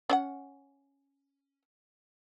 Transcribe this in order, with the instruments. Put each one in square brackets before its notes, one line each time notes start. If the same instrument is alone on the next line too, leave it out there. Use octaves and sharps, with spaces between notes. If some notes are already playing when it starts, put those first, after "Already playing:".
[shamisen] C#4 D5 F#5